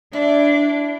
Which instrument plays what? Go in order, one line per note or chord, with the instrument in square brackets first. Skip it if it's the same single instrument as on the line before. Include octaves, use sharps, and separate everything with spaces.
[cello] D4 [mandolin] E4 [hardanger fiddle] D5